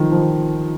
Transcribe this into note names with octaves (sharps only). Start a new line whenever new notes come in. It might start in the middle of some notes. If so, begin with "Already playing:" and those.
Already playing: D#3 F3
F3